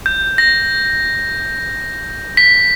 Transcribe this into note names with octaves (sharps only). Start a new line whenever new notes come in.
G6
A#6
B6